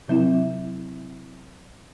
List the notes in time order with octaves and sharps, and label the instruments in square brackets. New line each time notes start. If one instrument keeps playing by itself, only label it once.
[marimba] C3 F#3 C4 E4